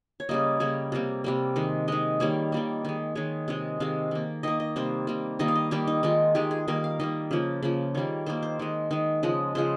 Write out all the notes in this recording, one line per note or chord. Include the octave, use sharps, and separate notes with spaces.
C#5
C#3 G3 A#3 D#5
C#3 G3 A#3 C#5
C3 G3 A#3
C3 G3 A#3
D#3 G#3
D#3 G#3 D#5
D#3 G3 A#3 C#5
D#3 G3 A#3
D#3 G#3
D#3 G#3 C#5
C3 D#3 G#3
C3 D#3 G#3 F5
D#3 A#3
D#3 A#3 D#5
D#5
C3 G3 A#3 C5
C3 G3 A#3
D#3 G3 A#3 D#5
F5
D#5
D#3 G3 A#3 G4
D#4
D#3 G#3 F4
D#3 G#3 G4
G#4
D#3 G3 A#3 A#4
F5
D#3 G3 A#3 D#5
C#3 F3 A#3
C#3 F3 A#3
D#3 G3 A#3 C#5
D#3 G3 A#3 C5
C5
D#3 G#3 A#4
D#3 G#3
C#3 F3 G#3 D#5
C#3 F3 G#3 C5